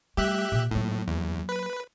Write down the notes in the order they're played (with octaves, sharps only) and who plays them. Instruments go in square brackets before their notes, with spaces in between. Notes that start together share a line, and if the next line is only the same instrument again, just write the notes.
[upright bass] G3 A3 [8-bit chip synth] G4 E5 F#6
[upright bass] A#2
[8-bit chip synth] A2 [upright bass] F#3 A#3
[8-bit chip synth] E2
B4